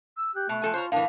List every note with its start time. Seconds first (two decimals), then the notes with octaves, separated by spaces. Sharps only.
0.17 E6
0.35 G4 F#6
0.49 B2 A3
0.62 F3 A4 G#5
0.74 F4 C5 C#5 A#5
0.92 A2 E3 D4 A#4 F5